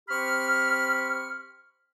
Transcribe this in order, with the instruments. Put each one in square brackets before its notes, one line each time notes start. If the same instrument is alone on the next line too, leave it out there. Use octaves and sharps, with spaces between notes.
[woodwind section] C4 G4 B5 C#6 F6